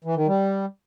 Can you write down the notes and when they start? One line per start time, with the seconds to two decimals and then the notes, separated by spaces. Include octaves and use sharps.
0.04 E3
0.16 D#3
0.27 G3